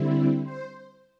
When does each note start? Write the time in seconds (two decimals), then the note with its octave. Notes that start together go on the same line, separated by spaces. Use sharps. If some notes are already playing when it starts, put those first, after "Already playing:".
Already playing: D3 G3 C4 E4
0.44 C5